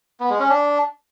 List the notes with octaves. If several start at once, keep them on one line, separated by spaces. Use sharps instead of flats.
B3
G#3
C#4
D4